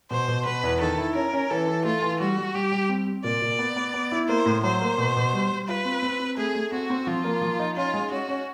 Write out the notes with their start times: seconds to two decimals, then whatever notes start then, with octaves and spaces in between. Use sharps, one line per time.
0.11 B2 C5
0.28 B2
0.46 B2 B4
0.63 E2
0.81 D#3 A4
0.98 E4
1.15 C#4 A#4
1.33 C#4
1.50 E3 A4
1.67 E3
1.85 A3 F4
2.02 E3
2.20 G3 F#4
2.38 G3
2.55 G3 G4
2.72 G3
2.89 C4
3.07 C4
3.24 A#2 D5
3.42 A#2
3.59 B3
3.76 B3
3.94 B3
4.12 E4
4.28 A#3 C5
4.46 A2
4.63 F#3 C5
4.81 A#3
4.98 B2
5.16 B2
5.33 G3
5.50 G3
5.68 F4 B4
5.85 C4
6.03 C4
6.20 C4
6.37 A3 G#4
6.55 A3
6.72 C4 F#4
6.90 C4
7.07 F3 F4
7.24 A#3
7.42 F3
7.59 D#4
7.77 C#4 F4
7.94 G#3
8.11 C#4 F#4
8.29 C#4